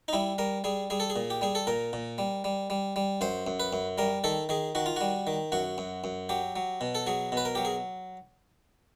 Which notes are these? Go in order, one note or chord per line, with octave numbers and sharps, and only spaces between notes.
D#4
G3 E4
G3 A#4
G3 G#4
G3 G#4
A4
G#4
A#2
G4
G3 G#4
A4
A#2 A#4
A#2
G3
G3
G3
G3
F#2 C5
F#2
B4
F#2
G3 A#4
D#3 A4
D#3 G#4
D#3 F#4
F4
G3 F#4
D#3
F#2 F#4
F#2
F#2
F#3 G4
F#3
B2
A4
F#3 G#4
B2 B4
A#4
F#3 G4
G#4